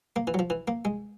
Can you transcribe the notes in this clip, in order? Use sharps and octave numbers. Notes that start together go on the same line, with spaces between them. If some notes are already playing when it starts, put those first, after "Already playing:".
A#3
E3
F#3
F3
E3
A#3
G#3